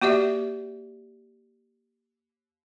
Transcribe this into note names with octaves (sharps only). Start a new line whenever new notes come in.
A#3 F#4 G4 D5 E5